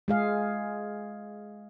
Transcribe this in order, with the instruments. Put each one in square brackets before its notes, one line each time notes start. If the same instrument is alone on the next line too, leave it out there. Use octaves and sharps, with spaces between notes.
[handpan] G#3 G#4 F5